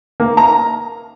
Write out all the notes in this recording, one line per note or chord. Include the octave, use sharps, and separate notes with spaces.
A#3
A#5